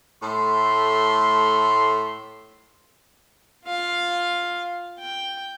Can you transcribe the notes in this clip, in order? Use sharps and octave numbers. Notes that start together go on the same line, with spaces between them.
A2 A3 C6
F4 F5
G5